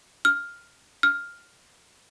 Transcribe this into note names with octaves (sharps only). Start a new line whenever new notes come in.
F6
F6